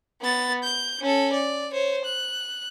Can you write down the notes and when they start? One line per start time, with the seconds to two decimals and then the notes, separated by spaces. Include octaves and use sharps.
0.22 B3 A6
0.64 G6
1.01 C#4 A4
1.33 D5
1.73 C5 C#5
2.05 F#6